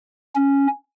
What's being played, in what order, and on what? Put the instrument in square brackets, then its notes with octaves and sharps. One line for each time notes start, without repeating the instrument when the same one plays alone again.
[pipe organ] C#4